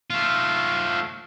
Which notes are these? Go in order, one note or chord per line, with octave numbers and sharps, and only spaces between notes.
A3 F4